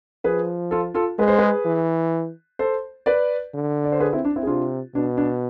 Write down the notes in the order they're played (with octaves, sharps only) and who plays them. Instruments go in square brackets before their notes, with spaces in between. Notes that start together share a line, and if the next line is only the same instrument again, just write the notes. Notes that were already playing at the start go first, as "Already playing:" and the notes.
[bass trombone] F3 [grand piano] G#4 B4
[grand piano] F4 A4
F4 A4
[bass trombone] G#3 [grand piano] B4
[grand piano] C5
G#4 B4
[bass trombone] E3
[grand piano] A4 C5
B4 D5
[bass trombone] D3
[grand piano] D5
C5
G#4 B4
C4 E4
D4
C4 E4
G#4
[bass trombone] C3 [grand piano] D4 F4
[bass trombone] B2 [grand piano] D4
[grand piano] D4